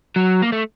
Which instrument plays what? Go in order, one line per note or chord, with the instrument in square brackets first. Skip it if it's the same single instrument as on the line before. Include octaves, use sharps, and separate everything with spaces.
[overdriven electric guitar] F#3
A#3
A3